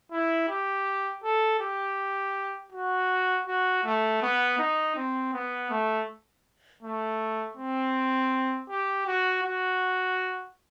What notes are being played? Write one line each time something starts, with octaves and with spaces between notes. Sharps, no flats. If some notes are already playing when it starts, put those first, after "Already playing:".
E4
G4
A4
G4
F#4
F#4
A3
B3
D#4
C4
B3
A3
A3
C4
G4
F#4
F#4